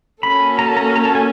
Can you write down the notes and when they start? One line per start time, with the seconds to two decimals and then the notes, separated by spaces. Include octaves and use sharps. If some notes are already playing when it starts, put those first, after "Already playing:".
0.23 A#3 C#4 F#4 A4 B5
0.59 A#5
0.68 A5
0.77 A#5
0.96 A#5
1.05 A5
1.15 G#5